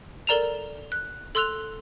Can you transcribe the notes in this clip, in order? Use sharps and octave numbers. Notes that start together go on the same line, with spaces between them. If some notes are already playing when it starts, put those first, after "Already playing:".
A4 A#4 D5 A#5 E7 F7
F#6
A4 C6 E6 F#6 F7